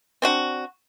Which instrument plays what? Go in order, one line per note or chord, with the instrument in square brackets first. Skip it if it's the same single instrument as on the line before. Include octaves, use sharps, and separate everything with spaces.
[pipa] C4 D4 F#4